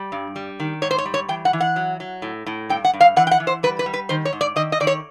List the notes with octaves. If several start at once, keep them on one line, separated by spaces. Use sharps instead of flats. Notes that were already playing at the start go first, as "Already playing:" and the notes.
Already playing: G3
G2
G3
D#3
G#2 C#5
C5
C#5
G3
C#5
E3 G5
F#5
E3
F#5
F#3
F#3
A2
A2
G2 G5
F#5
G2
F5
E3 F#5
G5
F#5
E3
C5
G3 B4
B4
G3
B4
D#3 C5
C#5
G#2
D5
D#3 D#5
D#5
D#3 D5
C#5